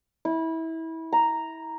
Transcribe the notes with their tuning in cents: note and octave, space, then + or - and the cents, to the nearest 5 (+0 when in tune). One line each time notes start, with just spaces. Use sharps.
E4 -25
A#5 +0